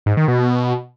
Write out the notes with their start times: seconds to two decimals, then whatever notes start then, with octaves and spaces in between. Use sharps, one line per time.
0.06 G#2
0.17 D#3
0.28 B2